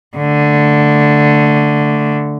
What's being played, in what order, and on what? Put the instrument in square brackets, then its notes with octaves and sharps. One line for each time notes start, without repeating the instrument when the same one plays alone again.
[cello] D3 A3